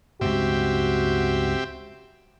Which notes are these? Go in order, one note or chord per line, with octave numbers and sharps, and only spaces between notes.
C#2 G2 C4 F#4 G4 E5